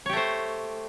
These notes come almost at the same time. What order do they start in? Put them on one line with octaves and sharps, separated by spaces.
C#5 G4 A3 C5